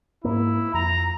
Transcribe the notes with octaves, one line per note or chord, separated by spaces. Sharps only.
G#2 A#3 E4
F2 A#5